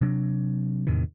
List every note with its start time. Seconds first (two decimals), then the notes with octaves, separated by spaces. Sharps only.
0.01 C3 F#3 D4
0.87 E2 A2 C3 D#3